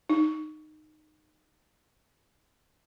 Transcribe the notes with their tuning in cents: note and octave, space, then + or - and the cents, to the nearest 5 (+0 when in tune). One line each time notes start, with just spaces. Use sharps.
D#4 -15